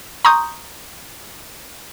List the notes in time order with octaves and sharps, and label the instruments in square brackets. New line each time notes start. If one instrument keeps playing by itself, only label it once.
[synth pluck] A#5 C6 C#6 D#6 G6